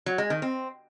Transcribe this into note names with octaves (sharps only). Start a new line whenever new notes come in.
F#3
G#3
D#3
C4